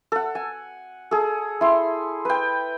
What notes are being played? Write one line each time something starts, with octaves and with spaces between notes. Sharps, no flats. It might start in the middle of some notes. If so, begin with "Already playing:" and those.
A4 F#5
G#5
G#4 A4
E4 C6
B4 G5